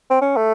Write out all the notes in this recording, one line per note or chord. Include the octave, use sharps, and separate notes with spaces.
C4
C#4
A3